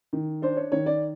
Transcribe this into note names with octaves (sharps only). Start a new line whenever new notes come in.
D#3
D4 C5
C#5
D#3 C#5
D5